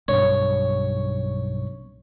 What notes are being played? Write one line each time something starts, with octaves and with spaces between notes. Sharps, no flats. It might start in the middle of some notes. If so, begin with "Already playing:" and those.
B1 G2 C#5